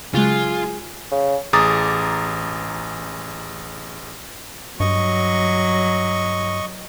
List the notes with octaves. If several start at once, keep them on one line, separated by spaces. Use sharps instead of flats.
C#3 F#3 G#3 F4 G#4
C#3
A1 G#4 A#5 D6 D#6 A6
G2 F#3 D#5 C#6